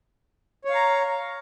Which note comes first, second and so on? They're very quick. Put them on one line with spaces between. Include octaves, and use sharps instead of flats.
C#5 F5 A#5